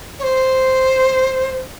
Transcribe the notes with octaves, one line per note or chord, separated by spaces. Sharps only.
C#5
C5